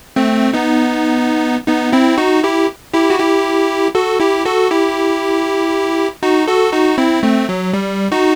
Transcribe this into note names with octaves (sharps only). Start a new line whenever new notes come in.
A3 C4
B3 D#4
B3 D#4
C4 E4
D#4 F#4
E4 G4
E4 G4
F#4
E4 G4
F#4 A4
E4 G4
F#4 A4
E4 G4
D#4 F#4
F#4 A4
D#4 F#4
C4 E4
A3 C4
F#3
G3
D#4 F#4